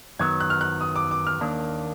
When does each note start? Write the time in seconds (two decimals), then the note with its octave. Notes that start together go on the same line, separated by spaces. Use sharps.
0.19 F#2 D#3 F#3 B3 G#6
0.40 F#6
0.50 F6
0.61 F#6
0.81 D#6
0.96 D6
1.11 D6
1.27 F6
1.41 D#2 D#3 A#3 D4